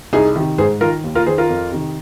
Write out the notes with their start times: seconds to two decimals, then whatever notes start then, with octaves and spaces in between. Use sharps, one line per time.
0.13 C2 D#4 G#4
0.36 C3 D#3
0.58 G#2 G#4 C5
0.81 D#3 F4 A#4
1.04 D#2
1.15 F4 A#4
1.26 D#3 G#4 C5
1.38 F4 A#4
1.49 F2
1.72 C3 D#3